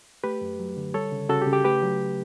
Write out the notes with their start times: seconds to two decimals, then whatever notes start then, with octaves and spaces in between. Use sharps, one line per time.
0.24 A3 G4 B4
0.41 F#2
0.59 F#3
0.77 D3
0.94 G3 A4 C#5
1.12 C#3
1.29 C#3 F#4 A4
1.42 G4
1.47 C#3
1.53 G4
1.64 A3 G4 B4
1.83 F#3